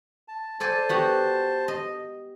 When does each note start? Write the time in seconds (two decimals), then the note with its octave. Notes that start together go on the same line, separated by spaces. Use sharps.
0.28 A5
0.60 A4 C5 D5 G#5 A5
0.89 B3 F#4 G4
1.68 D#5